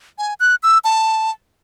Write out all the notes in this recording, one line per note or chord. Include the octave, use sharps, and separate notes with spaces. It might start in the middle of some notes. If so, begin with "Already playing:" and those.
G#5
F#6
E6
A5